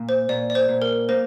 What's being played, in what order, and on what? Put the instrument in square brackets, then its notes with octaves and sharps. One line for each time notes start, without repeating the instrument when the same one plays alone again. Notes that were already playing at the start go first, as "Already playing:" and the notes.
Already playing: [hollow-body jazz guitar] A#2
[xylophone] C5
[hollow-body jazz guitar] A#2 [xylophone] D5
[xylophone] D5
C5
[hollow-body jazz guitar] A#2
[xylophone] A#4
[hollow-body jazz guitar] A#3 [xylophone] C5